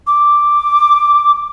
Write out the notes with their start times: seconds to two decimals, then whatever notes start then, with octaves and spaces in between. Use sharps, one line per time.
0.07 D6